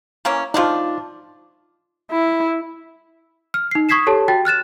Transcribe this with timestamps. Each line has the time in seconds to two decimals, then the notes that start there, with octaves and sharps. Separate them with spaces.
0.25 E3 A#3 C#4
0.54 F3 A3 D4 D#4 F4
2.11 E4
3.54 F6
3.71 D#4 C7
3.89 C#6 D#6 G#6 B6 C7 E7
4.07 G4 A4 C#5 A5
4.28 F#4 G5 A6
4.45 F6 F#6 A6 E7